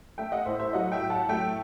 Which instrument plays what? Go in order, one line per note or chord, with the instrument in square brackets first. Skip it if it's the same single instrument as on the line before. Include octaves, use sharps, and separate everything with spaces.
[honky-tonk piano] A3 E5 G5
D#5 F#5
A2 C5 E5
C5 E5
F#3 D#5 F#5
E5 G5
A2
F#5 A5
A3 E5 G5